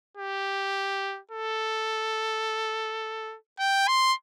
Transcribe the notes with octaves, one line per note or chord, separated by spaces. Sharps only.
G4
A4
G5
C6